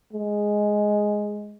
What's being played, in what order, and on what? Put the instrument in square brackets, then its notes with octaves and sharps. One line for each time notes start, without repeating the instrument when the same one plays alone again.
[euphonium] G#3